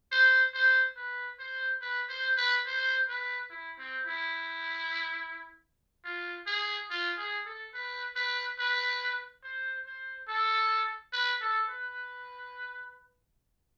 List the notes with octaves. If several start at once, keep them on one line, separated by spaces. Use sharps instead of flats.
C5
C5
B4
C5
B4
C5
B4
C5
B4
E4
C4
E4
F4
G#4
F4
G#4
A4
B4
B4
B4
C5
C5
A4
B4
A4
B4